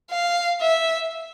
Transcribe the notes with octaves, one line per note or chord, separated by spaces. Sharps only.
F5
E5